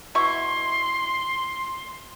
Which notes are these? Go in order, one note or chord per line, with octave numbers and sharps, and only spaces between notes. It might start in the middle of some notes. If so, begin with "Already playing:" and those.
B2 E4 C6 C#6